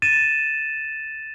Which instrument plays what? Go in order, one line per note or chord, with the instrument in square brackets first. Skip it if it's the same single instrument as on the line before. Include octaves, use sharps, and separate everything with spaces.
[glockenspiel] A6 D#7 E7